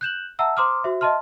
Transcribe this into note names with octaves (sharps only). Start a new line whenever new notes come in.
F#6 G6 E7 F#7
E5 F#5 A5 A#5 E6
C5 A#5 C6 D6 D#6 F6
F#4 C5 E5
D#5 E5 A5 C6 F6